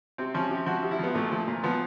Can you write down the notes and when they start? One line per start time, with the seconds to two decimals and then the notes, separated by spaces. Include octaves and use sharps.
0.18 C3 C4
0.34 F3 C#4
0.51 C3 G4
0.66 F3 F#4
0.83 C3
0.91 E4
0.99 F3 B3
1.15 A#2 A3
1.32 F3
1.48 A#2
1.63 F3 B3